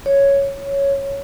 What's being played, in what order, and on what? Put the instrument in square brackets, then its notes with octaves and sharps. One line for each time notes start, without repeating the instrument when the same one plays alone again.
[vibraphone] C#5